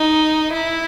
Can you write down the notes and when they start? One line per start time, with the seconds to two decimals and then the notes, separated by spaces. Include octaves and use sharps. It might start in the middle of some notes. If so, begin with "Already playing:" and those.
Already playing: D#4
0.53 E4